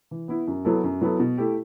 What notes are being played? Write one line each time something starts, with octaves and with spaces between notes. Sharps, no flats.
E3
B3 E4
F#2
F#3 B3 E4 A4
F#2
F#3 B3 E4 A4
B2
A3 E4 G4